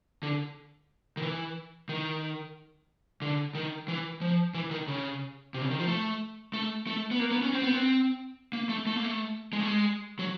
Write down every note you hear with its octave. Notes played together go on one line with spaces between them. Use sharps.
D3
D#3
E3
D#3
D3
D#3
E3
F3
E3
D#3
C#3
C3
C#3
D#3
F3
A3
A3
A3
B3
A#3
B3
C#4
C4
B3
C4
A#3
A3
A3
A#3
A3
G#3
A3
G#3
F#3